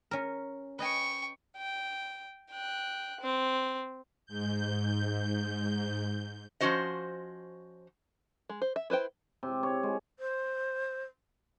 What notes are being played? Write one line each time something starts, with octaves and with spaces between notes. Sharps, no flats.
C#4 A#4
B4 D#5 G5 G#5 C#6
G5
G5 F#6
C4
G#2 G6
F3 G3 C#4 F#4 C5 D#5
G#3
C5
E5
E4 B4 C5 G5
C3
C#5
G#3
C5